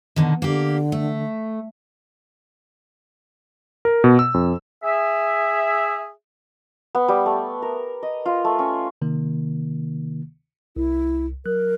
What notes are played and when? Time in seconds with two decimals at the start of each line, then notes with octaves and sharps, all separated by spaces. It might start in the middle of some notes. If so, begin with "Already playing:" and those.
0.16 B2 D3 D#3
0.42 D3 A#3 G4
0.92 A3
3.85 A#4
4.04 B2
4.19 E6
4.34 F2
4.84 G#4 E5
6.95 B3
7.08 G3
7.26 A3
7.62 A#4
8.03 D#5
8.26 F4
8.45 A3
8.59 C#4
9.02 C3 D#3 A#3
10.76 C2 E4
11.46 F#3 A#4 F#6